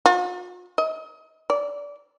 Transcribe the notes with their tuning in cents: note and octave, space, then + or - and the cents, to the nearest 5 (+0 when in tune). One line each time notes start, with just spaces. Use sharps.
F4 +45
D#5 +40
D5 -20